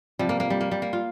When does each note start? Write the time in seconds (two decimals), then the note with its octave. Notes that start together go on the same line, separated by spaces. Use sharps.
0.19 C3 F3 G3
0.29 A#3
0.40 A#3
0.50 G3
0.61 A#3
0.71 G3
0.82 A#3
0.93 F4